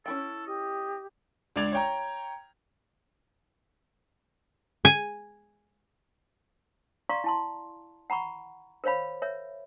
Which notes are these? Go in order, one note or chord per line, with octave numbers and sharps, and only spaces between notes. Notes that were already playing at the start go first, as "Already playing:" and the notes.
C#4 E4 A4 G5
G4 D#5
C#2 D4 D5 G#6 F7
C#5 G5 A#5
G#5
D5 F5 A#5 C6 C#6
E4 A5 C6
F#5 A#5 B5 C#6
A#4 C5 C#5 F5 B5
A#4 C#5 E5